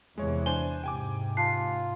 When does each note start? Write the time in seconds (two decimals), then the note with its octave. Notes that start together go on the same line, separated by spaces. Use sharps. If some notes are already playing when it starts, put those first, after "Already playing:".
0.18 E2 C3 E3 G#3 C#5
0.46 D4 C5 G#5 G7
0.84 G#2 C3 G5 G#5 D6
1.37 F4 A5 F#6 C7